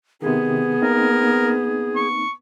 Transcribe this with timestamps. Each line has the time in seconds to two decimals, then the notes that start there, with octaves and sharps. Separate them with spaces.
0.22 C3 D#3 B3 G#4
0.82 A#3 C4 D#4 A#4
1.96 C#6